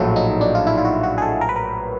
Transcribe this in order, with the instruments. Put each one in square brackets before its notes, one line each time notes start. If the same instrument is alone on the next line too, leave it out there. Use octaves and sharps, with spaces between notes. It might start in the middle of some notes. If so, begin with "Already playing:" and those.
Already playing: [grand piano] A#1 A2 F#3 A3 [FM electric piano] F4
[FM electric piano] D#4
D4
F4
E4
F4
F#4
F#4
G#4
A4
A#4
B4
A#4